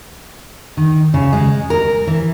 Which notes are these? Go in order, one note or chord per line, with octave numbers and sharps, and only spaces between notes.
D#3
C#3
G#3
A#4
E3